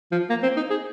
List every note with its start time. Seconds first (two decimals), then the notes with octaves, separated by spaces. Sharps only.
0.12 F3
0.30 A#3
0.43 C4
0.57 D#4
0.70 G#4